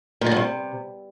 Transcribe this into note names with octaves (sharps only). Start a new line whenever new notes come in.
A#2
D3
G2
C3